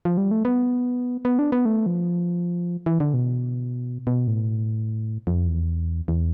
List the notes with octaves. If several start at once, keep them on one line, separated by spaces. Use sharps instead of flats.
F3
G3
A3
B3
B3
D4
B3
A3
F3
E3
D3
B2
B2
A2
F2
E2
E2